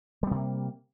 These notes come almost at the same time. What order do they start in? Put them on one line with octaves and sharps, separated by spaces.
G3 B3 C3 A#3